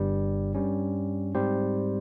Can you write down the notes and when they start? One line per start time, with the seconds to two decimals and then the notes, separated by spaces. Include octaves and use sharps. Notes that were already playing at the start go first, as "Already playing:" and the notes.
Already playing: G1 G2 G3
0.55 G2 G3 C#4
1.35 G#2 G3 C4 G4 C5